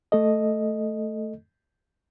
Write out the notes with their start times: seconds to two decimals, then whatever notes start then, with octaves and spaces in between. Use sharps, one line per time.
0.12 A3 A4 D#5